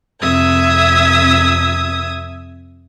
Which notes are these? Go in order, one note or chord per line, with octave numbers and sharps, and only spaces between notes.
F2 C3 E5 D#6 G#6